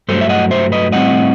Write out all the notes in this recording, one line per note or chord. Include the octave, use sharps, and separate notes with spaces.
G2 F#3 A3 A4 C5
E5
D#5 F#5
C5 E5
B4 D#5
A2 G3 C4 D#5 F#5